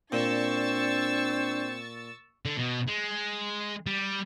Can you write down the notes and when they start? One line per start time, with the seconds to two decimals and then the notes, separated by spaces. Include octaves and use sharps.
0.12 A#2 C4 D4 C#6 E6 A6
2.45 D3
2.58 B2
2.87 G#3
3.86 G3